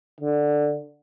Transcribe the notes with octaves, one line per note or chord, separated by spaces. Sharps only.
D3